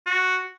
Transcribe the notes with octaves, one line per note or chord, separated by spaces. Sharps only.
F#4